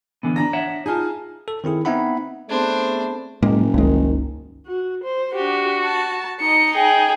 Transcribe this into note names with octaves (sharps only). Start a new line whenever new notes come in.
D3 E3 B3
D4 A#5 A#6
C#5 E5 F#5
D#4 F4 G#4 G#5 A5
A4
D#3 C4 E4 G#4
B3 C4 D#4 E5 F#5 B5
A3 B3 C4 D4 G#4 C5
F#1 A2 G#3 A#3
G1 C#2 D#3 G#3
F#4
C5
D4 F#4 G4
A5
D#4 D#5 C#7
G#4 G5